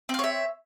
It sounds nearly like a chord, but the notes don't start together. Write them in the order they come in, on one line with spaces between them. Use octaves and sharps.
C4 F5 C#5 E5